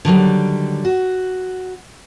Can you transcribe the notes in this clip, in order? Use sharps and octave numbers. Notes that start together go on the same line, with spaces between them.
D3 D#3 F#3 G3
F#4